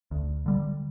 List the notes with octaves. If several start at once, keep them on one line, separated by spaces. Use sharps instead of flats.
D2
D3 G3